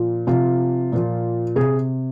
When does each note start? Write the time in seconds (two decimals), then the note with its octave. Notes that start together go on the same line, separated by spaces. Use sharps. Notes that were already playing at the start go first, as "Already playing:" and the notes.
Already playing: A#2 F3
0.27 C3 F3 F4
0.92 A#2 F3
1.56 C3 G#4